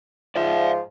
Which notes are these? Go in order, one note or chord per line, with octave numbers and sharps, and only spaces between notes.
G#2 F3 D5 E5